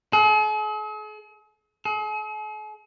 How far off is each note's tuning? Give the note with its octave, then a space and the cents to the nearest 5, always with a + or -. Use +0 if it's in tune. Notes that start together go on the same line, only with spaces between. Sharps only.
G#4 +45
G#4 +45